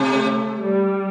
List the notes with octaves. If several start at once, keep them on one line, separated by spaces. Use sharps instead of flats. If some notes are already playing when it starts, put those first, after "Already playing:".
Already playing: C3 A3
G3